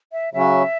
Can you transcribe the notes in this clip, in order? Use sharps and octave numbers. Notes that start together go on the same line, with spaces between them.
E5
C#3 F#3 C#4 F#4 E5